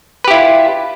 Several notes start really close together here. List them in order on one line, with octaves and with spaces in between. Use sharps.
B4 G4 E4 F4